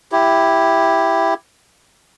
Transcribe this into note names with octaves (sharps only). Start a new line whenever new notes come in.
E4 G4